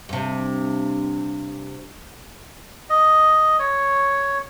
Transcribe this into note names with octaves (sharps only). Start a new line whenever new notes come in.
G2 C3
D#5
C#5